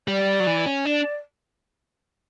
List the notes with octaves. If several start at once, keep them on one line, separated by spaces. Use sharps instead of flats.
G3 D5
F#3
E3
C#4
D4 D5